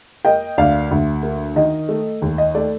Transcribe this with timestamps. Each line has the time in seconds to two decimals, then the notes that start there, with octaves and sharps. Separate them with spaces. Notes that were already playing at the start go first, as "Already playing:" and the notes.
0.25 A#3 D#5 G5
0.58 D2 D5 F5
0.91 D2
1.23 A#3
1.56 D#3 D#5
1.89 A3
2.22 D#2
2.38 D#5
2.55 A3 D5